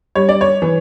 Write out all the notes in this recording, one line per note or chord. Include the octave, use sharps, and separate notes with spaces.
G3 C#5
D5
C#5
E3